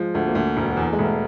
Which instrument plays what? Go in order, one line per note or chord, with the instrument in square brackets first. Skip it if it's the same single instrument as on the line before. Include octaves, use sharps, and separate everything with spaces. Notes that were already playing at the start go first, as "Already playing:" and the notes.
Already playing: [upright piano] F3 [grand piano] G#3
[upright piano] D2 [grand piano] A3
[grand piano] A#3
[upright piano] D2 [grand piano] A3
[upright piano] E1
E2
[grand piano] G#3
[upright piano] E1 [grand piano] A3